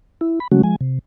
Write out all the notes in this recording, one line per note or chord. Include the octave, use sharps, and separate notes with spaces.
E4
B5
C#3 F#3 G#3 A3 C#4 F#4
F3 G#3 G#5
C3